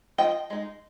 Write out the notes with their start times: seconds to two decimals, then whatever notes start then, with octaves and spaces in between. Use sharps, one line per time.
0.18 F3 D#5 G5
0.50 G#3 D#4